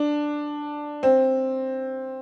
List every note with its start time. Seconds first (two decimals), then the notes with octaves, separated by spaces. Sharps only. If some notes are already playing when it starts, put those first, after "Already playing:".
Already playing: D4
1.03 C4